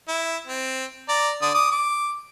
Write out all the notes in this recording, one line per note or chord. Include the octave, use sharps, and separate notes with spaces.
E4
C4
D5 A#5
D3 D5 D#6
D6 D#6
D6